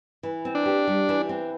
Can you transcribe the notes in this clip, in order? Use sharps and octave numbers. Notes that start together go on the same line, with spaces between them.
E3
C4
D4
G4
G3
E3
C4